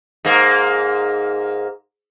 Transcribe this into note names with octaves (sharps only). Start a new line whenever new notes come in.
G#2 A#3